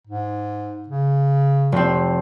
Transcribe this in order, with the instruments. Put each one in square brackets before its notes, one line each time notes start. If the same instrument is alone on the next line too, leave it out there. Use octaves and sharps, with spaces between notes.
[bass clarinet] G#2
C#3
[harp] F1 C4